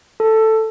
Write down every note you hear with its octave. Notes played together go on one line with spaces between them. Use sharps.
A4